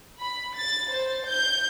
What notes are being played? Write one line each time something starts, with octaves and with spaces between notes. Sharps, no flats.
B5
A6
C5
G6